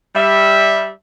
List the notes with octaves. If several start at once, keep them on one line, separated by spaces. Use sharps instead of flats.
G3 E5